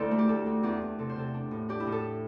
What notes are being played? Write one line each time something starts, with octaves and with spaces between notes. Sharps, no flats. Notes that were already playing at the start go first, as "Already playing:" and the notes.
Already playing: D2 E4 A4 C5 D5
A3
G4
D2 A4
D2
E2 G4
E2
C3 A4
C5
C3 A4
D4
A2
D4 G4
E4
A2
A4